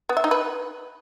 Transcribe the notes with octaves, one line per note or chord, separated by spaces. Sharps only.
B3
E5
D#4
B4